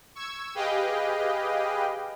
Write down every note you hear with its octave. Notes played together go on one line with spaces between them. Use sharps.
C#6 E6 G#6
G4 G#4 B4 D#5 F5 G5